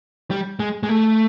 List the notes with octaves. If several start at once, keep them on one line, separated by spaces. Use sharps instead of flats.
G3
G#3
G#3
A3